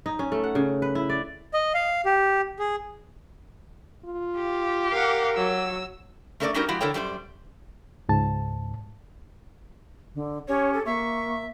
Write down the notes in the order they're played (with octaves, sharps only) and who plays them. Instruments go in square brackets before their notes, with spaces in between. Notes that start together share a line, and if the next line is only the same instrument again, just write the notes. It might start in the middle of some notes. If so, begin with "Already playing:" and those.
[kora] D#4
C#4
A3
F#5
C#3
B4
E4
D5
[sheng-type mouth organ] D#5
F5
G4
G#4
[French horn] F4
[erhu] G4
[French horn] A#4 [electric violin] F5 F#5
[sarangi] F#3 [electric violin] E6
[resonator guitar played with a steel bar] A3 C#4 A4 A#4 C#5 D5
G3 C#4 D#4 F#4 G4 A#4
F3 G#3 E4 F#4 G4
D3 E4 A4 A#4 C#5 G5
F#2 G3 G4 C5
[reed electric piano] C#2 G#2 A5
[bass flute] D3
[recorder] C#4 [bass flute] G4 [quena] C#5
[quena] A4
[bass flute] A#3 [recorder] E5 [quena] C#6